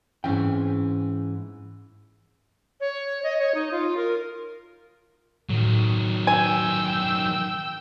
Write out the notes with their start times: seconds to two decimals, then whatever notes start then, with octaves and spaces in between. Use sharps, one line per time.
0.24 G#2 E3 C4 C#4 G5
2.81 C#5
3.23 D#5
3.39 C#5
3.55 D#4
3.72 F4
3.97 A#4
5.49 A2 D#3 F#3
6.27 G5 G#5 E6